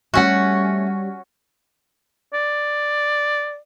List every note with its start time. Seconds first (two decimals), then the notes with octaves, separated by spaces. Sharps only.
0.14 G3 A3 C#4 F#4 F#5
2.33 D5